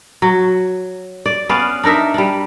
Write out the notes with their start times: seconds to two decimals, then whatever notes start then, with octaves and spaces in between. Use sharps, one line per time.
0.22 F#3
1.26 D5
1.49 B3 C#4 D5 F5
1.84 D4 D#4 A#4 E5
2.14 G3 D4